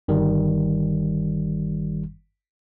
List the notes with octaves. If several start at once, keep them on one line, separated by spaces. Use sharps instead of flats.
G1 D#3 G3